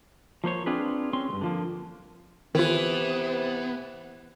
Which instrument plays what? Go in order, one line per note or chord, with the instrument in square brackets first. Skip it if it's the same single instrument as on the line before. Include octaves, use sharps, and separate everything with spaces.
[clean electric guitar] F3 A#3 C5 C#5
C4 D4 F4 G#4 B4
C4 C#4 C6
D2 G2
D3 F3 A#3
[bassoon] C3 [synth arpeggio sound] D#3 F4 [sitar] E3 [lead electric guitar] B3